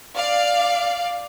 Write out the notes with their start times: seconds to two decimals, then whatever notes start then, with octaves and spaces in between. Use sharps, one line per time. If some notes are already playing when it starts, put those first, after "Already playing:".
0.16 D5 F5